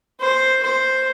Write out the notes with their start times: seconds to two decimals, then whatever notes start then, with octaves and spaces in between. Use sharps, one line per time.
0.20 C5
0.63 C5